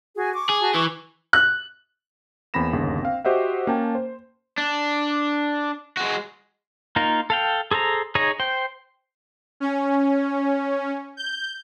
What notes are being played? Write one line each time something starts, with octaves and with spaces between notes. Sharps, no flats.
F#4 G#4 G#5
C#6 D6
G#4
F#4 A5
E3 G#5 C#6 D6
F#6
E2 A#3 C4 B5 A#6 E7
G1 D#2 C#3
C4 F5
F#4 G4 C5 D#5 E5 F#5
A#3 C#4 G5 A5
C5
D4
G#3 F#4
A#3 D#4 F4 A#4
A4 F5 G5
G#4 A4 C5 A#5
D#4 G#4 C#5 D#5
C5 G5
C#4
G6